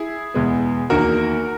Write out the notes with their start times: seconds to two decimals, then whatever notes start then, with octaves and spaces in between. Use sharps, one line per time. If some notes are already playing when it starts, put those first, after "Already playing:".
Already playing: E4 G#4
0.34 E2 B2 G#3 B3
0.90 E2 D#3 A#3 F#4 A#4